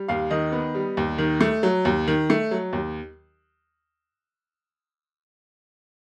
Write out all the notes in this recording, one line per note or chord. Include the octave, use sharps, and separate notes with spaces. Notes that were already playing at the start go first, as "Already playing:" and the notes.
Already playing: G3
D#2 F5
D#3 D#5
B3
G3
D#2
D#3
A3
F#3
D#2
D#3
A3
F#3
D#2